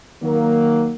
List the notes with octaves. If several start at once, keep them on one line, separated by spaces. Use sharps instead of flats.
D#3 F#3 A#3